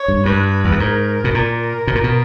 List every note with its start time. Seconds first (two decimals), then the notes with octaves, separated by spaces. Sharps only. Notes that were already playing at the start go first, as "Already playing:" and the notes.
Already playing: C#5
0.08 G2
0.26 G2 B4
0.65 E2
0.72 G2
0.80 G#2 A#4
1.24 B2
1.34 A#2 A#4
1.87 B2
1.95 A#2
2.04 B2